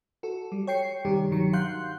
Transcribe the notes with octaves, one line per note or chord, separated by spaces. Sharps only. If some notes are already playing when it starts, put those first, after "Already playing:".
F#4 A4
G3
C#5 G5 C7 C#7
G2 C3 D#3 G3 G4
G1 D#3 F#3 C#7
F5 F#5 C6 F#6 G6